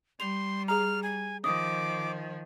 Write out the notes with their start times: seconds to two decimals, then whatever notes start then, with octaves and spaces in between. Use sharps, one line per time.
0.20 G3 C6 F7
0.68 G#4 A#5 F6
1.03 G#5
1.44 D#3 F3 D6 D#6